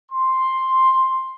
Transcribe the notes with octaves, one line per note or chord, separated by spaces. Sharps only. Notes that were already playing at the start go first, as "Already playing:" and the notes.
C6